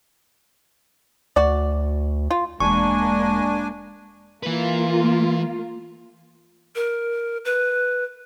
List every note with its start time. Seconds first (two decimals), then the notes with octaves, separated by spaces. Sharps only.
1.36 D2 F#4 D5
2.30 F4
2.60 E1 G#3 A#3 D4 G#5 C#6
4.43 E3 A#3 F4 B4
6.76 A#4
7.45 B4